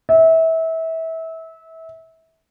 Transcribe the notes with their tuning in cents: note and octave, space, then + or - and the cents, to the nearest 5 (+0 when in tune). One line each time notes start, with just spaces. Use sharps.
E5 -25